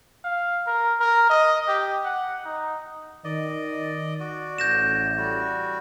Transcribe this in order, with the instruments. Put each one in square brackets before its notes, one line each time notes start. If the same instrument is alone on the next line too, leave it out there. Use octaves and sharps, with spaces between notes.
[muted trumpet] F5
A#4
A#4
D#5
G4
F#5
D#4
[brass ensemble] D#3 [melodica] D5 D#5
[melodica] F#4 D5
[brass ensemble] A1 [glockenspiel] G6 A#6 E7
[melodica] G3 F#4